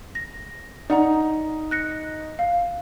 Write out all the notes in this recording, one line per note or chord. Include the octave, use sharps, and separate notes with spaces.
A#6
D#4 D5 F#5 A#5
F#6 A#6 C#7
F5